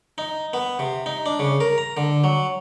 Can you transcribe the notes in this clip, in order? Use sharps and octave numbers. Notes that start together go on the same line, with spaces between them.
D#4
B3
C3
D#4
D4
C#3
A#4
A#5
D3
F#3